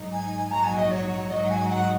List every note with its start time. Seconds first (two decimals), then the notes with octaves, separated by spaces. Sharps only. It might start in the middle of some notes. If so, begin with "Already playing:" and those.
Already playing: G#2 F#3 D#4
0.12 G#5
0.50 A#1 G#2 F#3 D#4 F#4 A#5
0.64 G#5
0.77 D#5
0.90 C#5
1.29 G#2 F#3 D#4 F#4 D#5
1.49 G#5
1.68 F#5